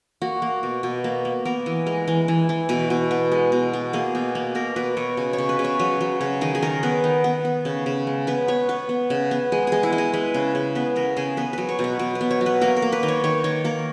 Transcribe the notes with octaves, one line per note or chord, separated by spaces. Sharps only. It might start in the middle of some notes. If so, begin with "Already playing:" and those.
A#3 F#4
A#3
B2
B2
A#3
A#3
B3 A#4
E3
G#3 A#4
E3
E3
E3
B2 B4
B2
B3
G#3
B2
B3
A#3 G#4
B2
A#3
B2 A#4
B2 B4
B2 C#5
C#3
C#5
C#3
B4
C#3
C#5
F#3 B4
F#3
C#3
D#3 G#4
G#4
D#3 A#4
B3 B4
D#3
B3
B3
C#3
C#3
G#3
B3 B4
B3 C#5
B3 B4
B3
C#3
B3
G#3 G#4
G#3 G#4
E4
G#3
G#4
G#3 B4
C#3
C#3
B3 B4
C#3 A#4
C#3 G#4
B3 B4
F#3 B4
C#5
B2
B4
B2 B4
B4
B3
C#5
F#3
B4
A#3 A#4
A#4
A#3
B4
D#3
C#5
D#3 C#5
D#3 C#5
A#3 A#4